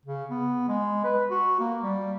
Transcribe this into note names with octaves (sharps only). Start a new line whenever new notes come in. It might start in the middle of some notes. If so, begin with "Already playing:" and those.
C#3
B3
G#3
B4
F#4
A#3
G3